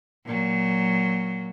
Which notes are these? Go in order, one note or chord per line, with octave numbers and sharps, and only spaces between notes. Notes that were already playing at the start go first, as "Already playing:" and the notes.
A#2 F#3